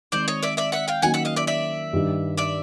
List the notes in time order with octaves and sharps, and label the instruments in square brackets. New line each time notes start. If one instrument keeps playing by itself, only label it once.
[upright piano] D#3 G#3 C4 [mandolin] C5 D5
[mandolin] C#5 D#5
D5 E5
D5 E5
E5 F#5
F5 G5
[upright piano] D#3 F#3 A#3 C#4 [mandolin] F#5 G#5
[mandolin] E5 F#5
D#5 F5
D5 E5
D5 E5
[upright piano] G2 D#3 G3
[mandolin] D5 E5